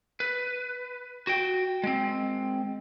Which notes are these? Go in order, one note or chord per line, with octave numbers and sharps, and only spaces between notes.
B4
F#4 G5
G#3 C4